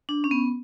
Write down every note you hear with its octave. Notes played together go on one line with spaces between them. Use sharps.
D4
C#4
B3